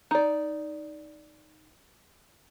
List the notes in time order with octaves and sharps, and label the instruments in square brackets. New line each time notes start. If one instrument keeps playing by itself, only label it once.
[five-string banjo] D#4 D5